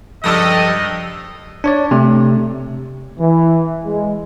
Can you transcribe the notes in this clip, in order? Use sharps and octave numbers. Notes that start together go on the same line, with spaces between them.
C#2 G2 F3 G4 A4 D#5 D#6 E6
D4 C#5 D5
C3 A3
E3
G#3